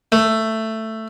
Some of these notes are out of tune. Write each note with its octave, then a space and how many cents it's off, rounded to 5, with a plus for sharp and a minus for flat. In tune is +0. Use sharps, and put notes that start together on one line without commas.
A3 +10